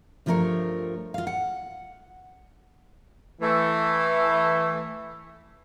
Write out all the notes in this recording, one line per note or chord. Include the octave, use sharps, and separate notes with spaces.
G2 F3 A3 F4 A#4 C#5
F4 F5
F#5
E3 A3